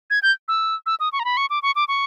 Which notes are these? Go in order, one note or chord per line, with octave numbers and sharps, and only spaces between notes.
G#6
G6
E6
E6
D#6
C#6
A#5
B5
C#6
D6
C#6
D6
C#6